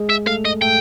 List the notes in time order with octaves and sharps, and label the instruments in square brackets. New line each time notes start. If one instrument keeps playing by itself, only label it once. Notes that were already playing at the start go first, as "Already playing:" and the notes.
Already playing: [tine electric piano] G#3 G#4
[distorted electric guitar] E5
[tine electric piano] A3 A4 [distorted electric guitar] F5
[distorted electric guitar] D#5
[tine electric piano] A3 A4 [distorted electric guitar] G5